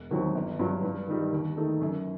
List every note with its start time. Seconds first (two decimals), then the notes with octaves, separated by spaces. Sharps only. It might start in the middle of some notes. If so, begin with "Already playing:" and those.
Already playing: E1
0.11 D#2 D#3 F#3 C4
0.35 G1
0.59 G2 F#3
0.83 G2
1.08 D#3 G3 D#4 G4
1.32 D#2
1.57 D#3 A3 D#4 A4
1.81 F#2